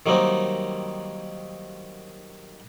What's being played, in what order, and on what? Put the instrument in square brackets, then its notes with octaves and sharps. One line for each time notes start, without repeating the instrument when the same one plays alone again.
[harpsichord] D#3 F#3 G3 A#3 C4 D#4